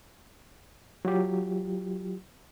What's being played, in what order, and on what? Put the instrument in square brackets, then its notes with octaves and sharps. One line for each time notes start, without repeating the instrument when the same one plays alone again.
[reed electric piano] F#3 F4 G4